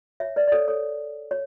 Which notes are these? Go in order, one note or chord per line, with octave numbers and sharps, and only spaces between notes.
C#5 E5
B4 D5
D5
A4 C#5
A4 C#5
C#5